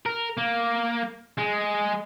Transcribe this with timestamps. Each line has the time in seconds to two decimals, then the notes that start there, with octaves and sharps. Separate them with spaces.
0.06 A#4
0.37 A#3
1.38 G#3